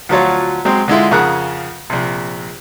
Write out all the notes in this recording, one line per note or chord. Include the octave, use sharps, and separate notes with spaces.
D2 F3 F#3 F4 C#5
F#3 G#3 C4
D3 G#3 E4 F4
F2 C#3 G#4 A#4 F#5 F#6
A#1 C3